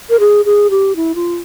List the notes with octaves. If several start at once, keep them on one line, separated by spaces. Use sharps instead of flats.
A#4
G#4
G#4
G4
E4
F4